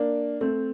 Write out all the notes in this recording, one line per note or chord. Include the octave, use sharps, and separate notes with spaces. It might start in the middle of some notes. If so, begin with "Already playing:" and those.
Already playing: A#3 D4
A3 C4